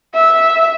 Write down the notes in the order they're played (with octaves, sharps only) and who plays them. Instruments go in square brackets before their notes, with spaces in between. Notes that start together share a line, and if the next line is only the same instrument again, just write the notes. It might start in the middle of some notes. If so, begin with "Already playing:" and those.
[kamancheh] E5